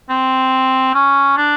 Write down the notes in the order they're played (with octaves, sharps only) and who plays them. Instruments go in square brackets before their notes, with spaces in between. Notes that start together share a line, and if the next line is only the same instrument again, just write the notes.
[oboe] C4
C#4
D4